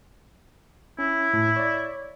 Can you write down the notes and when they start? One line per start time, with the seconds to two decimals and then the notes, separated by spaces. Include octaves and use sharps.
0.99 C#4 E4
1.34 A2
1.56 C#5 D5